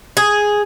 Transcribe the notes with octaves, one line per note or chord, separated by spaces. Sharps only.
G#4